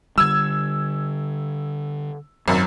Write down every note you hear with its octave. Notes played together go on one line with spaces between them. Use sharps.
D3 G3 E6 G#6
G#1 F#2 F#3